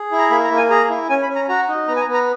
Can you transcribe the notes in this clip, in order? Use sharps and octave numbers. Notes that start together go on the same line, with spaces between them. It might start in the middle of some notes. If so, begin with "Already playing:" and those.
Already playing: G#4
E4
A#5
A#3 B5
A#5
A#3
G#5
G#4 A#5
E4
C#4 G#5
B5
C#4
A#5
F#4 A#5
D#4
B3 A#5
G#5
A#5
B3
A#5